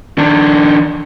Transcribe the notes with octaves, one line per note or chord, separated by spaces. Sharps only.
D#3 D4